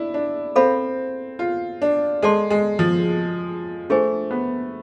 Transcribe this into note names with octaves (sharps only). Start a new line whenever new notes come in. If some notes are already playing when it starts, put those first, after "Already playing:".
Already playing: D4 E4
D4
C4 A4 C5 F5 B5
F4
D4
G#3 A4 D5 A5 C6
G#3
F3
A3 D4 F4 G#4 C5 G#5
B3